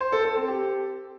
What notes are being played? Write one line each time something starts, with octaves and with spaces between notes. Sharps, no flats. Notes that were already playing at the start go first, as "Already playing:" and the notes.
C5
A4
A4
C4
G4